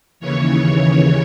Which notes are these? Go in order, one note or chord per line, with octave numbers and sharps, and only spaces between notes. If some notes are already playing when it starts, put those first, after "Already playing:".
D#2 C#3 E3 C#5